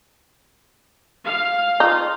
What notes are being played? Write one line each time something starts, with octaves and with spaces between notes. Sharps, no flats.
F5
D#4 F4